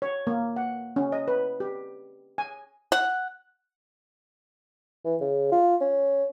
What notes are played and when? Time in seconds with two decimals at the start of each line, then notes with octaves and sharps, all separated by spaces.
0.02 C#5
0.27 A#3
0.56 F#5
0.96 C#4
1.12 D#5
1.28 B4
1.60 G4
2.38 G#5
2.92 F#5
5.05 E3
5.21 C#3
5.52 F4
5.81 C#4